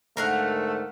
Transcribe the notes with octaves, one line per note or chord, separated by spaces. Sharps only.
G#2 D3 A3 A#4 F5 F#5